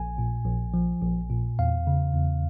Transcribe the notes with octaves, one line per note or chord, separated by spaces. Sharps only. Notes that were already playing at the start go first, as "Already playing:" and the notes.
Already playing: A#1 G#5
A#2
A#1
F3
A#1
A#2
E2 F5
C#3
E2